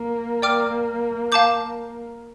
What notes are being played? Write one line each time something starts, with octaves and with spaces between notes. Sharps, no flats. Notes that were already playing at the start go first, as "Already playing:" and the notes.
Already playing: A#3
D5 G5 D6 F6
F5 A5 D6 G6